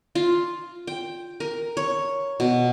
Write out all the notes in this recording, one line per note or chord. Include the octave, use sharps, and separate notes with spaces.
F4
G5
A#4
C#5
B2